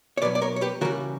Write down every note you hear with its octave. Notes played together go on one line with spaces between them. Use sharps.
C#5
B2 F#3 B4 D5
D5
A#4 C#5
C#5
G4 B4
C#3 E3 G3 F#4 A#4